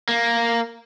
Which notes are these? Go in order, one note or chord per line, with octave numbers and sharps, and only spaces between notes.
A#3